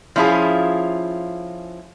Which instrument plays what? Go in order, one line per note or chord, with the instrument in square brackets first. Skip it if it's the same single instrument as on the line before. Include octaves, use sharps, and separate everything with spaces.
[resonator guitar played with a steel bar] F3 C#4 E4 F4 G#4 G#5